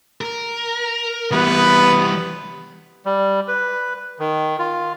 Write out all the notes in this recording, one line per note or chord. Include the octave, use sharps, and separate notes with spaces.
A#4
E3 G3 B3 B4
G3
B4
D#3
F4